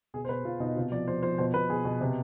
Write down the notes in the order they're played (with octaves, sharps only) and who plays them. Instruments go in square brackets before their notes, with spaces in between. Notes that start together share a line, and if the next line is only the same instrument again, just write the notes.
[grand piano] B2 G#4
C5
B2 B4
B2 F4
B2 D#4
C3 F4
F3 D5
F3 C5
F3 C5
B2 C5
B2 B4
B2 G#4
B2
C3